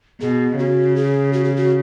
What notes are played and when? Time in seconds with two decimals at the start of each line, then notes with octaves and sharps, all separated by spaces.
0.20 B2 G#4
0.59 C#3 F#4
0.96 G#4
1.33 F#4
1.44 G#4
1.57 F#4